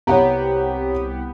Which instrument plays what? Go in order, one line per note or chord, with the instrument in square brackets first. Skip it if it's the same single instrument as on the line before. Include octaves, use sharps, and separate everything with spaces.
[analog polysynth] C2 B3 G4 [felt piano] C#5 F#5 A#5